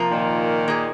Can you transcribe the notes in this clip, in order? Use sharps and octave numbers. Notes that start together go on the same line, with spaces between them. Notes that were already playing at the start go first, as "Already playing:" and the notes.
Already playing: C3 F3 A#3 F4 A#4
A#2 D#3
A#3 G#4 D#5